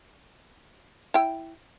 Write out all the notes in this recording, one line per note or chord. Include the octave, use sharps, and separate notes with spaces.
E4 G5